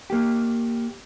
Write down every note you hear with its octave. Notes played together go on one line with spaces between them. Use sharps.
A#3 G4